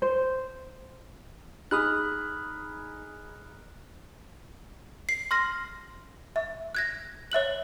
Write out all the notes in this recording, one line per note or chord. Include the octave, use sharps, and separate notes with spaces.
C5
D#4 G#4 B5 D#6 F6 F#6
C7
C6 F6 A#6
E5
F#6 G#6 A#6
C#5 E5 F#6 F#7